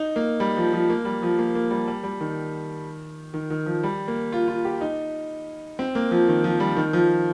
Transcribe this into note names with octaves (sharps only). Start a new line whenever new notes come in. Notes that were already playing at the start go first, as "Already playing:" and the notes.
Already playing: D#4
A#3
G3
F3
F3
A#3
G3
F3
A#3
A#3
G3
G3
G3
D#3
D#3
D#3
F3
G3
A#3
F4
F4
G4
D#4
C4
A#3
F3
D#3
F3
G3
D#3
F3